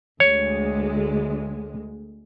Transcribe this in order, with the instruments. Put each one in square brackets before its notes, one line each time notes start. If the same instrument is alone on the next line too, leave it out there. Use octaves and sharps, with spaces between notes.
[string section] D2 G#3 [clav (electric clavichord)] C#5